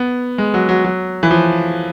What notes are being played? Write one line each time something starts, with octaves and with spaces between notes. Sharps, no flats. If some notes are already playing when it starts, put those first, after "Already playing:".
Already playing: B3
G#3
F#3
F#3
F#3
E3
F3